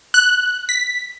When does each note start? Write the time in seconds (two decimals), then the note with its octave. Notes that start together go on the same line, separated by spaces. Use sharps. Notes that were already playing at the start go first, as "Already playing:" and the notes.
0.14 F#6
0.69 B6